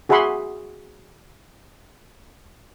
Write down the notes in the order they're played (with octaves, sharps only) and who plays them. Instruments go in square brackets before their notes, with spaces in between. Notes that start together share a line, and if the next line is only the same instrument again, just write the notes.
[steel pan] F#4 G#4 E5 F#5 B5 C6